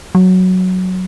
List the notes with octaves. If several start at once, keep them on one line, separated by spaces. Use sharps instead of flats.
F#3